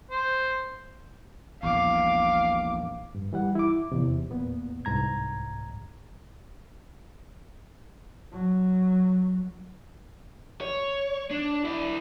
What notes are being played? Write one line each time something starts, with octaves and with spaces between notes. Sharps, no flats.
C5
A#1 E2 F5 D6
G2
E3 G3 F#5
E4 D6
E2 C3
E2 A#2 B3
C2 G#2 A#5 G#6
F#3
C#5
D4
E4 D5